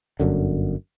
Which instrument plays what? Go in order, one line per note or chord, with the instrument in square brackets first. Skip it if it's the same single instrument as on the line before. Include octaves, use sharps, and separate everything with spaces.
[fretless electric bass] G1 F#2 D3